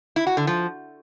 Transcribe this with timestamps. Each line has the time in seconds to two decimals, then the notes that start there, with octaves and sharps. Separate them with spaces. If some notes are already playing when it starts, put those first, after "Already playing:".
0.16 E4
0.27 F#4
0.37 D3
0.47 F3